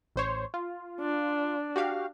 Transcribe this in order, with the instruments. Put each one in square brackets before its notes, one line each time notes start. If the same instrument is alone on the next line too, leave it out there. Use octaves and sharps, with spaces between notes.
[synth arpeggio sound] A1 C5 C#5
F4
[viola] D4
[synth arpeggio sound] F#4 G4 F5